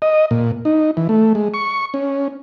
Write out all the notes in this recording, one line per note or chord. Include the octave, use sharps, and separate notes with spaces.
D#5
A#2
D#4
E3
A3
G#3
C#6
C#4